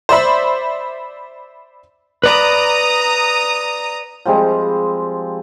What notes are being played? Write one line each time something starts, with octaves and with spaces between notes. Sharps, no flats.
C5 D5 E5 B5
B4 D5 A#5 B5 D#6
F3 G3 G#3 C4